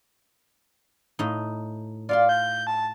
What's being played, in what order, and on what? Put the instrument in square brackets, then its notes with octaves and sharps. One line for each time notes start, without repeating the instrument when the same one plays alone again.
[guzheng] A2 D#4
[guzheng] F4 F5 C6 [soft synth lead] D5
[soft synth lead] G6
A5